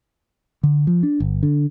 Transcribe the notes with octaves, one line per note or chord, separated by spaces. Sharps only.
D3
F3
D4
G1
D3